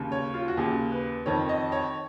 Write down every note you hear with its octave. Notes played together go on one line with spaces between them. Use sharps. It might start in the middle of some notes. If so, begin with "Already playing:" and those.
Already playing: D#2 C#3
C#5
F4
F#4
D#2 C#3 G#4
B4
F2 D#3 C#5
D#5
C#5